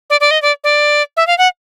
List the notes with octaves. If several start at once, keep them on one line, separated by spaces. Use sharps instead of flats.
D5
D5
D#5
D5
D5
E5
F5
F#5